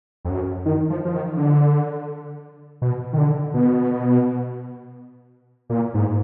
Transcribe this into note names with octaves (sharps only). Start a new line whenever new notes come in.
F2
F#2
D#3
F3
F3
D#3
D3
B2
D#3
D3
B2
A#2
G#2